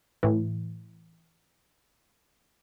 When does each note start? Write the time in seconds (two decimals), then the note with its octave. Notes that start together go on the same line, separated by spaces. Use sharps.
0.23 A2 E3